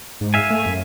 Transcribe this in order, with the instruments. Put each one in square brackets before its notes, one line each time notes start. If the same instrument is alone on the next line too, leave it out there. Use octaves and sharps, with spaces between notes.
[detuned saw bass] G#2
[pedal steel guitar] E5 F5 G#5
[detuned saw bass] A3
F#2